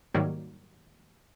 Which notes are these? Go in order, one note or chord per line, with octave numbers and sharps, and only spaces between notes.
G#2 D#3 F#3 G3 A#3